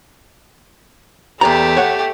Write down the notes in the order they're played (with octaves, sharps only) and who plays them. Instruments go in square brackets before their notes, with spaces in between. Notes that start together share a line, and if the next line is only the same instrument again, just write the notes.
[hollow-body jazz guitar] E2 D5 A#5 [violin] A3 G4
[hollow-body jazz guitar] C#5 F#5